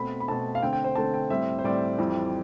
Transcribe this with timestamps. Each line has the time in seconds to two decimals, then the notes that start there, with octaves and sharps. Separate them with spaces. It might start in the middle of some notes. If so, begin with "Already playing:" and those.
Already playing: B2 A3 C4 B5
0.20 B5
0.28 B2 A3 C4 A5
0.55 F5
0.63 D3 A3 C4 G5
0.73 G5
0.84 C5
0.96 D3 A3 C4 A5
1.14 G5
1.30 A2 G3 C4 E5
1.59 C5
1.64 A2 G3 C4 D5
1.98 F2 E3 G3 C4